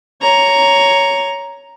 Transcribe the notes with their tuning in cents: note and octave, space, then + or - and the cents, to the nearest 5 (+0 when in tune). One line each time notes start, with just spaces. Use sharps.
C#5 +10 A#5 +0